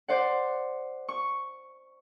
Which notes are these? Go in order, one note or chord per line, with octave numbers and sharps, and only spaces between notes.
C5 D5 F#5
C#6